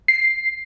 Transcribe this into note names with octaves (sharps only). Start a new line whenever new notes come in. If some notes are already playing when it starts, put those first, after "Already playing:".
C7